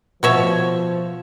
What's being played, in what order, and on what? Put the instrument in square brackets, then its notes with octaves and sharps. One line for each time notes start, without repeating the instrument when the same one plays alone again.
[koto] B2 C#5 E5 [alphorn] F3